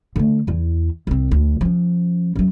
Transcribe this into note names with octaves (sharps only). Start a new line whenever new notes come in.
D3 A3
E2 E4
C2 C4
D2
F3 C#4
F#2 F#3